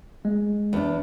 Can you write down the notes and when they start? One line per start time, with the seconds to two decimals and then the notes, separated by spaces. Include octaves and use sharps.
0.25 G#3
0.73 E2 D4